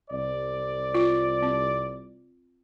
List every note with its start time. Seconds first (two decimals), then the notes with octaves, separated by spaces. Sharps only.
0.10 C2 D5
0.94 F4
1.42 C4